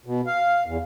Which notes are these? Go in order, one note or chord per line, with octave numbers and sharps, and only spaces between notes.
B2
F5
E2